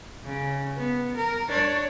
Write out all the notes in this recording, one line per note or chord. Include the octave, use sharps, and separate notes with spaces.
C#3
B3
A#4
D4 C#5